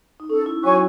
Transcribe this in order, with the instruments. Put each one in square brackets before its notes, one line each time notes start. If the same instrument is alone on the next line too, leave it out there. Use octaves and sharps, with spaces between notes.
[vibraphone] D#4
[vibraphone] C#4 [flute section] A4
[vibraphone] E4
[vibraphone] F#3 F#4 [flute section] C#5 G#5 C#6